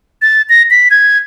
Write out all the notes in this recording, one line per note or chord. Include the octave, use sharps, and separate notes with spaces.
A6
A#6
B6
G#6